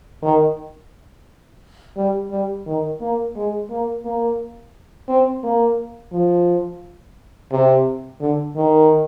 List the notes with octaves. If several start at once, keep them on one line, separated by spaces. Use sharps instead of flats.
D#3
G3
G3
D#3
A#3
G#3
A#3
A#3
C4
A#3
F3
C3
D3
D#3